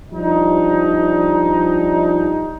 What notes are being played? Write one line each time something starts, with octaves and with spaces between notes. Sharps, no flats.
F3 G3 D4 D#4